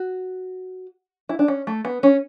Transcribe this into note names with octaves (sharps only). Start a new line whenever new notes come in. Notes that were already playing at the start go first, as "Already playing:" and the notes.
Already playing: F#4
E4
D4
C#4
A3
B3
C#4